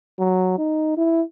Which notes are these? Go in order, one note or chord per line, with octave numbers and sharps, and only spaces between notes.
F#3
D#4
E4